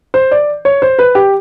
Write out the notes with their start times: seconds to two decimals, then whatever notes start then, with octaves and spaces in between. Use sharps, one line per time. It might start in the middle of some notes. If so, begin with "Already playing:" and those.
0.14 C5
0.32 D5
0.65 C#5
0.82 C5
0.99 B4
1.15 G4